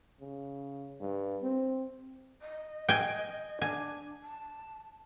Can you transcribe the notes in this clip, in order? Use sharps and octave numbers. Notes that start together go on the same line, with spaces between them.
C#3
G2
C4
D#5
G5 G#5
D4 G#5
A5